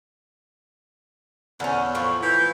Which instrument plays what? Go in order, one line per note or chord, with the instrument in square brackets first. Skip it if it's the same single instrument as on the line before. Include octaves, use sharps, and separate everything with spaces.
[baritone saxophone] E2 [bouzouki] D3 C#4
[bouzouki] A2 F3 F4 [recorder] C#6
[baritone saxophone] E3 [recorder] G6